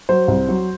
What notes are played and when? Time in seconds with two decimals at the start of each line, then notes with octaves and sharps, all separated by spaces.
0.09 F#3 C5
0.28 C2
0.48 F#3